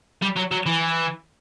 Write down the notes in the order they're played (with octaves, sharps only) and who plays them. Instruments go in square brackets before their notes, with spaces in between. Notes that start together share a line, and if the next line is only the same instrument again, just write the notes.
[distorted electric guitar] G3
F#3
F#3
E3